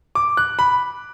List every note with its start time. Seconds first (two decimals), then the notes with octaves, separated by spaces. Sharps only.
0.15 D6
0.37 F#6
0.59 B5